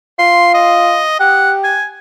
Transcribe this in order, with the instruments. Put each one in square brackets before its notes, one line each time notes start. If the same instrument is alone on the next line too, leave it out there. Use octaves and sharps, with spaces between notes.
[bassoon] F4 [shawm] C6
[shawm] D#5
[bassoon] G4 [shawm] F#5
[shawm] G#5